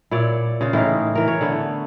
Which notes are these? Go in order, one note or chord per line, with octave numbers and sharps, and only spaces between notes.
A#2 E4 C#5 D5
C#3 F4
A2 E3 D#4 F5
E3 A#4
C#5
D3 A3 B3